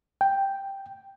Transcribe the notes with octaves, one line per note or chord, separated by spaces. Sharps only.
G5